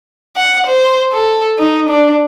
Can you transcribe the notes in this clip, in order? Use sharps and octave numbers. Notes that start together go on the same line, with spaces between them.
F#5
C5
A4
D#4
D4